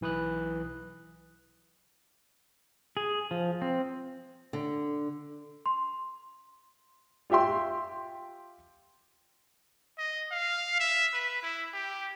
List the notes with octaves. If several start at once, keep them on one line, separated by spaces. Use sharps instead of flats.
B1 E3 B4 D#6 F#6
G#4
F3
C4
D3
C6
F4 G4 E5 G5 C6
D#5
F5
E5
B4
E4
G4